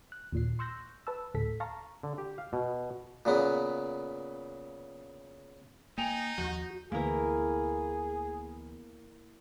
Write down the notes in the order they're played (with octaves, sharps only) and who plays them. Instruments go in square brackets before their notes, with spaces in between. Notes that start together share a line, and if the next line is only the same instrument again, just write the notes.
[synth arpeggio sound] F#6
D#2 A#2 C7
C6 C#6 E6 F#6 G6 A#6
B4 A5 E6
D2 A2 A4 B6
F5 A5 A#5 C#6
[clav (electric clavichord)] D3
G4
F5
B2
[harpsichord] A#2 C#3 B3
[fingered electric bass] A#3 [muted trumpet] D#4 [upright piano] G5 G#5 F7
[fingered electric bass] D#2 F3 [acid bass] F#4 [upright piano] G6
[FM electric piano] D2 E3 B3 [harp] A#3 E4 A#4 [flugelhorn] G#4